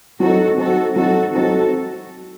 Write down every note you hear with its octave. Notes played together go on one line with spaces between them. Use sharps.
F#3 C4 D#4 F#4 A4
F#3 C4 D#4 F#4 A4
F#3 C4 D#4 F#4 A4
F#3 C4 D#4 F#4 A4